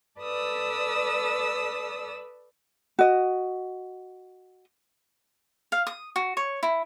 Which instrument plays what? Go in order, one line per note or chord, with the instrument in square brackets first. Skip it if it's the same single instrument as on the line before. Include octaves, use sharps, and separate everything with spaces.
[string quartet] A4 B4 D5 D#6 E6
[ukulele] F#4 D#5
[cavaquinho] F5
D#6
F#4
C#5
E4